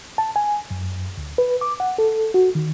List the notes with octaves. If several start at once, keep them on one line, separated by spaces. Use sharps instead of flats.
A5
G#5
F#2
D2
B4
D6
F#5
A4
F#4
D#3